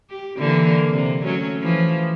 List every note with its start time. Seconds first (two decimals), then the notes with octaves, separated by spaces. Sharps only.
0.10 G4
0.38 D3 E3 A#3
0.91 C3
1.24 F#3 A3 C#4
1.62 E3 F3